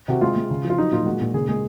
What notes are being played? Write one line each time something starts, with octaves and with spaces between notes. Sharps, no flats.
C3 F#4
G#3 F4
G#3
C#3
F3
F4
F#3 D#4
A#2 F4
G#3 F#4
A#2
C#3 G#4
G#3 G#4